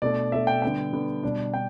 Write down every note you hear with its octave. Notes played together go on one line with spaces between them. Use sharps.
B2 A3 D4 D5
B2 A3 D4 E5
G5
D3 G3 B3 D4 G5
D3 G3 B3 D4
B2 G3 D4
D4 G5